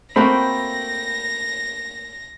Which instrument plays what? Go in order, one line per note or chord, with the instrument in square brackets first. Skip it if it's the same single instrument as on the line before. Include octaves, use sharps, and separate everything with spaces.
[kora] A3 A#3 F#4 [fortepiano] C4 [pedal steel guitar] G5 B5 [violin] A#6